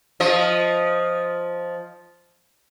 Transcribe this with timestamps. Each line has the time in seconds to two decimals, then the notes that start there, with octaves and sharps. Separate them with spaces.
0.20 F3 D#5